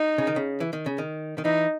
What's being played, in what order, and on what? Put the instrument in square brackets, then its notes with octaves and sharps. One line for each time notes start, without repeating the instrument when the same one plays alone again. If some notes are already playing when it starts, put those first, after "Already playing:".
Already playing: [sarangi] D#4
[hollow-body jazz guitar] C#3
D#3
C#3
E3
D#3
C#3
D#3
D#3
[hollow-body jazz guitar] E3 [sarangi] D#4